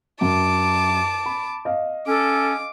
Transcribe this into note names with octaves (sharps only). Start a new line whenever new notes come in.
F#2 A5 D6
B5
D#5 F5
C#4 A4 D6